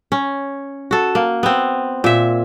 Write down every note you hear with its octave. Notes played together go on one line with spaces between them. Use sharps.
C#4
F#4 A4
A#3
B3 C4
A#2 E5